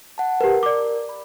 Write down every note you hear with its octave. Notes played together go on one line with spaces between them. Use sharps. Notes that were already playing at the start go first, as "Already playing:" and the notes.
F#5 A5
G4 A#4 B4
D5 D6
B5